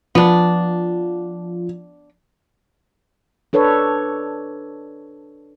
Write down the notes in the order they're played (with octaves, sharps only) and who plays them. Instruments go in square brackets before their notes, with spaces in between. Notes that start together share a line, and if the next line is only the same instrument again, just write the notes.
[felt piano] F3 [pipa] B3 D4
[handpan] D4 A4 B4 C#5